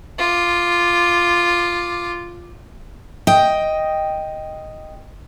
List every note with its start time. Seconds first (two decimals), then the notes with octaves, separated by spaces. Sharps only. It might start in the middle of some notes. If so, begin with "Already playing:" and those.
0.19 F4 D6
3.27 D#5 G5